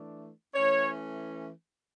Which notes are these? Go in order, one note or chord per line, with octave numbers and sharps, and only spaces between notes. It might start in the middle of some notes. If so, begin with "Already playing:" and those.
Already playing: E3 A3 D4
E3 A3 C#4 C#5